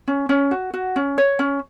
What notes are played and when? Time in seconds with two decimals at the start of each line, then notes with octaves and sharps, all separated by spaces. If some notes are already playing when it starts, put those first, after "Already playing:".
0.08 C#4
0.29 C#4
0.51 F#4
0.74 F#4
0.96 C#4
1.18 C#5
1.39 C#4